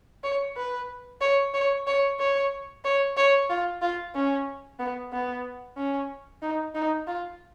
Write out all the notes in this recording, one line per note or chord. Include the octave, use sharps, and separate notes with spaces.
C#5
B4
C#5
C#5
C#5
C#5
C#5
C#5
F4
F4
C#4
B3
B3
C#4
D#4
D#4
F4